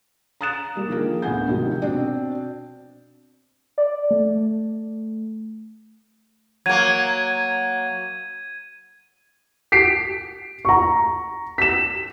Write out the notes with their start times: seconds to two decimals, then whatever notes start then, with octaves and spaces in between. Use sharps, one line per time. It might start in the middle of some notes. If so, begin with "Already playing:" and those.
0.41 A#5 D#6 F#6 A6 E7
0.76 G3 A#3
0.89 D3 D#3 F3 A#3 G#4 A#4
1.22 D2 A2 B3 F#5 G#5 G6
1.49 G#2 C3 D#3 F3 F#3
1.82 B2 C4 D4
3.78 D5
4.11 A3
6.66 F#3 A#3 G#6 D#7
9.72 B6 C7 D7
10.65 A#5 C#6
11.58 B6 E7